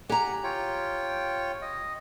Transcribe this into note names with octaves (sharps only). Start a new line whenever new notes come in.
G4 F#5 G#5 A#5
F4 C#5 G5
D#5